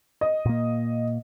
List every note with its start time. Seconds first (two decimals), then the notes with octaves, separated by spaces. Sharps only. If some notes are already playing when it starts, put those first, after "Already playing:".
0.21 D#5
0.46 A#2 A#3